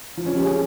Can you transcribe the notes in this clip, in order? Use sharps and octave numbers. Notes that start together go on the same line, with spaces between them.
F3
C#4
G4
G#4